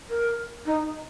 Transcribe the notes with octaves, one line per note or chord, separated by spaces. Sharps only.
A#4
D#4